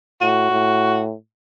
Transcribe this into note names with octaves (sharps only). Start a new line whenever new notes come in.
A2 F#4
A2